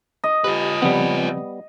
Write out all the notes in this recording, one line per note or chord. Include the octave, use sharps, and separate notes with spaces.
D#5
F4 G4 B4
C#3 F3 G3 B3 C4